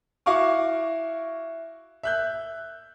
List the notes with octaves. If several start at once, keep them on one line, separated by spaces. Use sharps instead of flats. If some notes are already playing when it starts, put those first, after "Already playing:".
E4 F#4 F5 C#6 D6
E5 F#6 G6